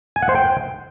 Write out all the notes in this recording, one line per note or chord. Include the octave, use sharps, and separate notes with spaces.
G#5
F#5
C5
G5